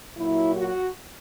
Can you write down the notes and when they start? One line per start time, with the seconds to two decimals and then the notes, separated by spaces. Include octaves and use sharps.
0.16 A#2 F#3 E4
0.55 F#4